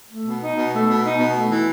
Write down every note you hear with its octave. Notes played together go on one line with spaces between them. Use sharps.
A3
B2
D#4
B2
A3
B2
D#4
B2
A3
E3